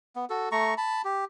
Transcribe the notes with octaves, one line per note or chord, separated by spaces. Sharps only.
B3
F#4 A4
A3 A#5 C#6
A5 B5
G4